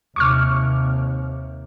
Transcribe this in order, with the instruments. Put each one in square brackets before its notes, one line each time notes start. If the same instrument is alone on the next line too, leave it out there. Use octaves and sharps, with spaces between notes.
[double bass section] D#2 C3 [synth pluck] C#6 D6 F6